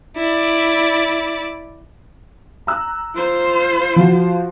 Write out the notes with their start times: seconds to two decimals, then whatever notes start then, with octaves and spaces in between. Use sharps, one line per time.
0.16 E4 D5
2.67 A#5 E6 F#6
3.15 F4 C5
3.96 F3 F#4